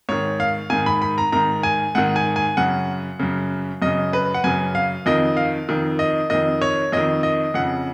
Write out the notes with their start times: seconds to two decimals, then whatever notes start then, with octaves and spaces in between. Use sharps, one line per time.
0.09 G#2 D#3 C#5
0.40 F5
0.70 G#2 D#3 G#5
0.86 B5
1.02 B5
1.18 A#5
1.32 G#2 D#3 A#5
1.63 G#5
1.95 G#2 D#3 F#5
2.16 G#5
2.36 G#5
2.57 F#2 C#3 F#5
3.19 F#2 C#3
3.82 F#2 C#3 D#5
4.13 B4
4.34 F#5
4.44 F#2 C#3 G#5
4.75 F5
5.06 F2 D#3 D#5
5.37 F5
5.69 F2 D#3
5.99 D#5
6.30 F2 D#3 D#5
6.62 C#5
6.92 F2 D#3 D#5
7.23 D#5
7.54 F2 C#3 F#5